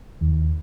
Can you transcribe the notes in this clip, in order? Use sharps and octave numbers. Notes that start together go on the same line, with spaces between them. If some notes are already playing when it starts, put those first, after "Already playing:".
D#2